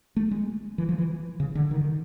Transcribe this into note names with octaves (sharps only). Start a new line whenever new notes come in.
A3
G#3
E3
F3
E3
C#3
D3
D#3
D#3